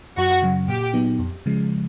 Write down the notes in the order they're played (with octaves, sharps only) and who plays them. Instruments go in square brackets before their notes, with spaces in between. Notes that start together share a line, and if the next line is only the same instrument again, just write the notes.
[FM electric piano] F#2 [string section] F#4
[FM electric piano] C#3 F#3
[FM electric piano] A#2 [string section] G4
[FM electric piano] F#3 B3 D#4
F2
C#3 F3 G#3